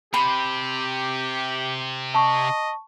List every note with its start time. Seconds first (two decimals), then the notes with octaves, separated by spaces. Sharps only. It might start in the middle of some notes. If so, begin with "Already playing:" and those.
0.14 C3 G4 B5
2.14 D#5 A5 C#6